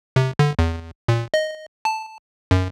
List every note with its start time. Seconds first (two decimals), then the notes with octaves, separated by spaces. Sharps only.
0.16 C3
0.39 D3
0.59 E2
1.08 A#2
1.34 D#5
1.85 A5
2.51 F#2